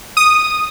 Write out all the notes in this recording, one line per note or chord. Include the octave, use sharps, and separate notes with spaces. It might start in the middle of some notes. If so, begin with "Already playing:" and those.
D#6